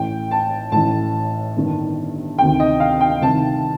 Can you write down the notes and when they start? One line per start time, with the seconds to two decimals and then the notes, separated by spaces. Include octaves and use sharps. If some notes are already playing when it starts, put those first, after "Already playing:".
Already playing: A1 A2 G5
0.31 A5
0.72 A1 A2 A5
1.56 G1 G2 D#3
2.39 D2 C3 D#3 G5
2.60 D#5
2.80 F5
3.01 G5
3.21 C2 C3 D#3 A5